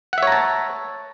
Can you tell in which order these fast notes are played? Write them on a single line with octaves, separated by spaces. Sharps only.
F#5 E5 C#5 A#5 A5